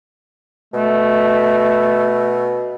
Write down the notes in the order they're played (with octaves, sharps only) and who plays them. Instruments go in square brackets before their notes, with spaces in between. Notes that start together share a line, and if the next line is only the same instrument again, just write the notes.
[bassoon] B2 [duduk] A3